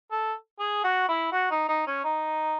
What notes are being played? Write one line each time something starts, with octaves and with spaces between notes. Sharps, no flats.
A4
G#4
F#4
E4
F#4
D#4
D#4
C#4
D#4